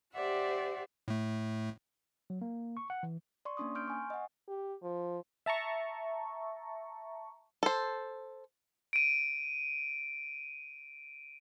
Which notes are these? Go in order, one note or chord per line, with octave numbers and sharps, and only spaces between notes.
G4 C5 D5 E5 F#5
A2 A3
F#3
A#3
C#6
F#5
E3
D5 C6 C#6
A#3 C#4 D4 C6 D#6
C6 F6 G6 D7
G#5 C#6
D#5 F#5
G4
F3
E5 A5 A#5 C#6
A4 C5
D7 D#7